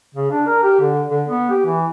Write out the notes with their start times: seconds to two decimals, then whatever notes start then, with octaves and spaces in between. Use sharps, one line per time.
0.15 C#3
0.31 D4
0.46 A#4
0.63 G4
0.80 D3
1.09 D3
1.28 B3
1.50 G4
1.66 E3